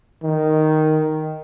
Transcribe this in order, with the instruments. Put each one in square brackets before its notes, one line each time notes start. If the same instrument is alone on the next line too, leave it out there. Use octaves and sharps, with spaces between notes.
[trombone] D#3